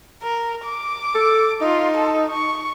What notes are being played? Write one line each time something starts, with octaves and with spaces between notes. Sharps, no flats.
A#4
D6
A4
D#4 F4
A4
C#6